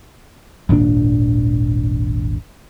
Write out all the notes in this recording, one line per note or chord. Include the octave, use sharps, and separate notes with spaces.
D#1 G#1 A#2 D4